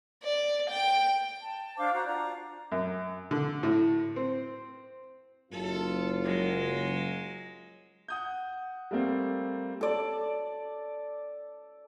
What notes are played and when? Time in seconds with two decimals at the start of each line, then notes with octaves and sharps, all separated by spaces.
0.23 D5
0.70 G5
1.41 A5
1.77 D4 C5 F5 D6
1.93 F#4 C5 A#5
2.06 D4 F4 A#5
2.72 F#2
3.31 D3
3.63 A2
4.16 C4
5.52 F#1 F#2 F4 A4
6.23 F#3 G#3
8.08 F#5 D#6 G6
8.91 G3 A3 A#3 C4
9.81 A4 D5